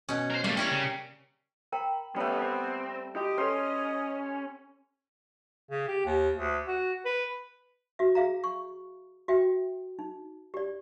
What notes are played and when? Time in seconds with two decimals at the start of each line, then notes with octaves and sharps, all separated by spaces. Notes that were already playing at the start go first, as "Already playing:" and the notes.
0.09 B2 C#4
0.31 A#4 C5
0.44 G3 A3 A#3
0.57 G3 C#4 E4 A#4 C#5
0.71 C#3
1.72 A#4 G5 A#5 B5
2.16 G3 A3 B3 C#4 B4
2.41 C4 D6
3.16 F#4 G4 D#5
3.38 C#4 A4 B4 C6
5.70 C#3
5.88 G4
6.06 D#2
6.37 D2
6.67 F#4
7.06 B4
7.99 F#4 E5
8.15 G#4 E5 F5 A#5
8.44 C#6
9.28 F#4 E5 G5
9.99 D#4
10.54 G4 D5